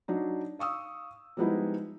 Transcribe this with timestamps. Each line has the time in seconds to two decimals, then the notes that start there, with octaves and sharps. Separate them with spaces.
0.08 F#3 D4 D#4
0.59 F5 C#6 D#6 E6
1.37 F3 G3 G#3 B3 D#4 E4